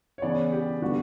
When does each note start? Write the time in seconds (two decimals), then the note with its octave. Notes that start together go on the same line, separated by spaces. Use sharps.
0.18 C#5
0.22 C#3 E3 B3 D5
0.52 G4
0.82 D3 G3 B3 F#4